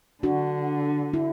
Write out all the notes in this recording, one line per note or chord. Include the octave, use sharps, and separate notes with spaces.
D3 D4 F#4
E4